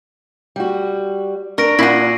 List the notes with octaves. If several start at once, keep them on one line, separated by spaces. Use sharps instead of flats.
G3 F#4
D4 A#4 C#6 A#6 D7
A#2 E4 F#4 G#6 C7 D#7